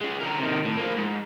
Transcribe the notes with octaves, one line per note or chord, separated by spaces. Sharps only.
G#3 C#4
D3 A#4
C3 D#3
A2
F3 A#3
G#2